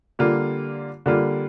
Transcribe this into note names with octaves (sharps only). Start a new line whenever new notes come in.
D3 G3 A#3 F4
D3 G3 A#3 F4